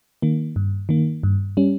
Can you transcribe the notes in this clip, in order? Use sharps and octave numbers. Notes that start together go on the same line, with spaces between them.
D#3 A#3
G2
D#3 A#3
G2
G3 C#4